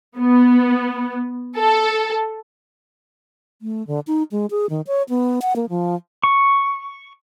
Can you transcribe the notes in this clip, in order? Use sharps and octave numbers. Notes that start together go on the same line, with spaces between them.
B3
A4
A3
D3
D#4
G#3
G#4
D#3
C#5
B3
F#5
A#3
F3
C#6